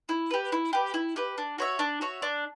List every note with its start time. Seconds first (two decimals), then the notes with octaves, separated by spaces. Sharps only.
0.09 E4
0.31 G4 B4
0.52 E4
0.73 G4 B4
0.94 E4
1.16 G4 B4
1.38 D4
1.58 F#4 C#5 E5
1.79 D4
2.01 F#4 C#5 E5
2.22 D4